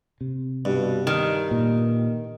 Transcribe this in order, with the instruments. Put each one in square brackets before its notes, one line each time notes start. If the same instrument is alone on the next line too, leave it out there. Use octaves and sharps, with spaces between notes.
[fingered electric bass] C3
[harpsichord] G2 [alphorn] B2
[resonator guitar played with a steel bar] D#3 [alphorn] D#4
[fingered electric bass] A#2